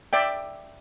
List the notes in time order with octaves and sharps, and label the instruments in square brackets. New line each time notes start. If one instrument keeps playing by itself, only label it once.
[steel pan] D5 E5 G5